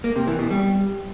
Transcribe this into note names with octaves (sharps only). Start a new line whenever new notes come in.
A#3
C3
E3
B2
G3